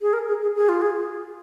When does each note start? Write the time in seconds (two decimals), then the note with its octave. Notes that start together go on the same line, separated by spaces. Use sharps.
0.02 G#4
0.13 A#4
0.28 G#4
0.42 G#4
0.56 G#4
0.69 F4
0.82 G#4